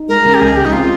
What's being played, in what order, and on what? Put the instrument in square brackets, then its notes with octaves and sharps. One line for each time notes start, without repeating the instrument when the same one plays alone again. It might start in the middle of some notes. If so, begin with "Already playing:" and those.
Already playing: [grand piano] D#4
[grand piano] G#3 [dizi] A#4
[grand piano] C#3
[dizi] G4
[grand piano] C#2 [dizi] G#4
[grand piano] C#2 [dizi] G4
[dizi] D#4
[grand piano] C4 [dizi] F4